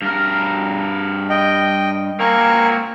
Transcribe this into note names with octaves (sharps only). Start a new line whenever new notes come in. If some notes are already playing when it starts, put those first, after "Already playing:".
G2 A#4
D#5 G5
A#3 C4 A#4 G#5 C#6